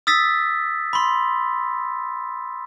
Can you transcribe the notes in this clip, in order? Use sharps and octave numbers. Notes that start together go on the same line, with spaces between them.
D#6 E6 A6 B6
B5 C6